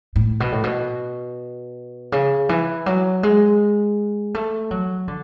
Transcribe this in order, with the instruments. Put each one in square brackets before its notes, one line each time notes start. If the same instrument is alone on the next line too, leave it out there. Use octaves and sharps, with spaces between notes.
[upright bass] A2
B2
A2
B2
C#3
E3
F#3
G#3
A3
F#3
D3